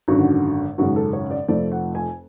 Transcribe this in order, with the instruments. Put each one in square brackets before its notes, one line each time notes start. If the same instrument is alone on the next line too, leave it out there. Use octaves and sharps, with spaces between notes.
[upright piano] G#1 F#2 D3 F#4
G#1 F#2 C#3 G#3 F#4
A4
C#5
D5
F1 F2 F3 A3 D5
F#5
G#5